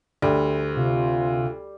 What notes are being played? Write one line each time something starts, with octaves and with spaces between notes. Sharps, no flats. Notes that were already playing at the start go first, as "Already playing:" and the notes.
D2 G3
C3 F4